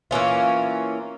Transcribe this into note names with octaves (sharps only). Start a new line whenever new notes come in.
E3 A#3 C#4 F4